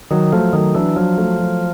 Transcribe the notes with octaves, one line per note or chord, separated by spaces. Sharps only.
D#3 F#3
F3 A3
D#3 F#3
E3 D4
F3 F#3
A3
F#3